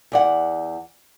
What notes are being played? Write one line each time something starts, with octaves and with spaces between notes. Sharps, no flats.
E2 D5 F#5